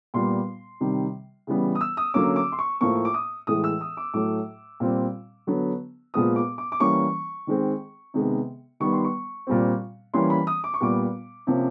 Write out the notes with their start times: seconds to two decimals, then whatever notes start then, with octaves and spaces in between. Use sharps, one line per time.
0.14 A#2 G3 B3 C6
0.81 C3 D#3 G3
1.47 C#3 E3 G3 B3
1.75 D#6
1.81 E6
1.97 D#6
2.14 D3 F#3 A#3 C#4 D6
2.36 D6
2.52 C6
2.59 C#6
2.81 A2 F3 A#3 C#6
2.96 C#6
3.05 D6
3.14 D#6
3.47 A2 E3 G#3 D#6
3.64 E6
3.81 D#6
3.97 D6
4.14 A2 F#3 A3 D6
4.80 A#2 G3 C4
5.47 D3 F#3 B3
6.14 A#2 F3 G#3 B3 D#6
6.36 D6
6.58 D6
6.72 D6
6.80 E3 G3 A#3 C#4 C#6
7.47 D#3 G#3 C4
8.14 C3 D#3 G#3 B3
8.80 D#3 G3 B3 C#6
8.93 C6
9.05 C#6
9.47 A#2 G3 C4
10.14 E3 G3 A#3 C#4 C6
10.30 B5
10.47 D#6
10.64 D6
10.74 C#6
10.80 A#2 G3 B3 D6
11.47 C3 F3 A#3 C#4